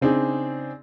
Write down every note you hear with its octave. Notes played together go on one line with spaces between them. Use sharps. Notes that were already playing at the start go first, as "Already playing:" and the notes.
C#3 C4 D4 D#4 G#4